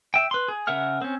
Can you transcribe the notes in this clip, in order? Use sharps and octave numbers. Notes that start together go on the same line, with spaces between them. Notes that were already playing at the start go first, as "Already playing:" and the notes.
E5 G5
B4 C6
G#4
C#3 A#4 E5 F#5 F6
C4 C#4